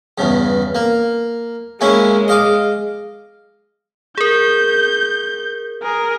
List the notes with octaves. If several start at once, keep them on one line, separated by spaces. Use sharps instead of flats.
E2 G2 C#3
A#3
G#3 A#3 C#4 E4
D#5 F5 D6
G#4 A#4 G6
G#4 A#4